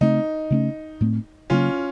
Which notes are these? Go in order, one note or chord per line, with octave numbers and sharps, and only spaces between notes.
C#3 A3 C4 D#4
C#3 A3 C#4
A2 A3 C4
C#3 F#3 A#3 C#4 F4